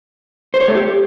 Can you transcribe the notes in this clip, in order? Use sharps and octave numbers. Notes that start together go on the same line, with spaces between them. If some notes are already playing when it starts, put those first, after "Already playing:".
C5
C#5
A3
G4